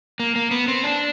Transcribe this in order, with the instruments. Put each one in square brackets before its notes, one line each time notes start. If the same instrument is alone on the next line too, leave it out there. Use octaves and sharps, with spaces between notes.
[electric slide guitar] A#3
A#3
B3
C4
D4